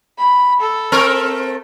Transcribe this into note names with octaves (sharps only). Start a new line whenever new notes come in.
B5
A4
A3 C4 A#4